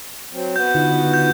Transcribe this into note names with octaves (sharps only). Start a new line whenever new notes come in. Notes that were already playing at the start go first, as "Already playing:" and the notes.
F#3 C4
B3 F#4 G6
D3 D#4 F4
G6